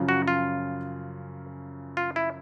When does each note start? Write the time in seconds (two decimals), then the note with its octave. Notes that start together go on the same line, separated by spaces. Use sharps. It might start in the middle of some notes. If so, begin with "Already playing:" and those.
Already playing: F#2 C#3 F3
0.09 F#4
0.28 F4
1.97 F4
2.16 E4